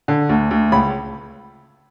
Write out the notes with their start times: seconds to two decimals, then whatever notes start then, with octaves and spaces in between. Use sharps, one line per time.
0.08 D3
0.29 D2
0.51 D2
0.72 C#2 B5